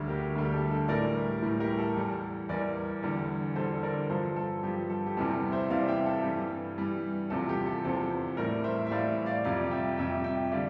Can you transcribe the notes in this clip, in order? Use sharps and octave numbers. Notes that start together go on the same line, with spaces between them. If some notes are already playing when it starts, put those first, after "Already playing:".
Already playing: D2 D3 G3
G4 A#4
D2 D3 G3
G4
A4
A4
A2 E3 G3 A#4 D5
G4
A2 E3 G3
G4 A#4
A4
E2 E3 G3
E2 E3 G3 A#4 D5
E2 D3 G3
E2 D3 G3 A4 C5
A#4 D5
G2 F3 A4 C5
A4
G2 F3 G4
A4
G4
E2 C3 E3 G3 A4
C5 E5
E2 C3 E3 G3 D5 F5
E5 G5
A4
G2 E3 G3 G4
G2 E3 G3
E2 C3 F3 A4
G4
A4
E2 C3 F3 A4 C5
A2 E3 G3 A#4 D5
C5 E5
E5
A2 E3 G3 D5 F5
D5 F5
F2 C3 G3 D5 F5
E5 G5
F2 C3 G3 E5 G5
E5 G5
D3 G3 D5 F5